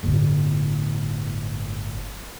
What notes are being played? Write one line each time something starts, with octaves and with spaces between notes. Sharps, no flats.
G1 A2